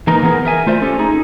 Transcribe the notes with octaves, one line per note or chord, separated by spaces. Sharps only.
E3 A#3 D#4 A#4
E3 B3 G#4 A#4
A#4 E5 G#5
A3 F4 C5 D5 E5
C#4 G4 A4
D#4 G#4